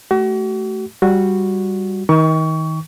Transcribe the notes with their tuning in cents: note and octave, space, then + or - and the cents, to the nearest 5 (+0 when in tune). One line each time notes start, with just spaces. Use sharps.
A3 -15 F#4 +40
G3 +0 F#4 -10
D#3 +30 C#6 +25